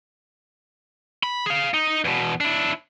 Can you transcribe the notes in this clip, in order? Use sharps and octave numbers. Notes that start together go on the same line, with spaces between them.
B5
G#4 F5
D#4
E2 B2
D4 E4